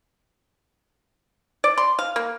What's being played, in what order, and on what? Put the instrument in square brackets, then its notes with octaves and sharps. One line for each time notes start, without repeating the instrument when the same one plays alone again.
[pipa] D5
C6
F5
A#3